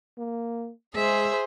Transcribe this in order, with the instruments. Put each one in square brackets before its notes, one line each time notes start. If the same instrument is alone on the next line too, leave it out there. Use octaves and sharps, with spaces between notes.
[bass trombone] A#3
[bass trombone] G#3 [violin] G#4 C5 [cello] E5